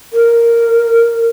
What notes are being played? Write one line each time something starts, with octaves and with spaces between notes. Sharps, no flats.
A#4